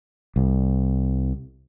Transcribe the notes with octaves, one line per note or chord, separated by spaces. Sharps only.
C2